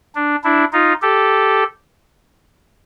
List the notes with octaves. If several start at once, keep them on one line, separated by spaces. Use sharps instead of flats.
D4
D4 E4
D#4 F4
G4 A4